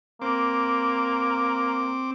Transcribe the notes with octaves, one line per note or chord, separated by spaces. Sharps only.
A#3 C4 D6